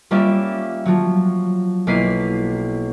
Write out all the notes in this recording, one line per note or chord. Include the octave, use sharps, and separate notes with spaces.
G3 A#3 C#4 F4 E5
F3 F#3
B1 A#3 E4 B6 C7 D#7